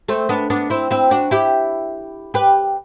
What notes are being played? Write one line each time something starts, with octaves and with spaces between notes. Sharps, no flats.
A3 C4
B3 D4
B3 D4
C4 E4
C4 E4
D4 F#4
E4 G4
G4 B4